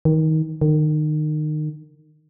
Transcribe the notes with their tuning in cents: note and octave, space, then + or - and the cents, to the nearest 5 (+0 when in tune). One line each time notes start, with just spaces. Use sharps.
D#3 +20
D#3 -30